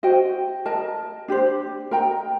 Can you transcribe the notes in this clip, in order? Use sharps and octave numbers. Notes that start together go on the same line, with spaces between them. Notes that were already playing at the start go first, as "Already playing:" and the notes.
F#4 C5 D#5 G5
A#4 D#5 A5
D4 G4 C5
A#4 D#5 G5 A#5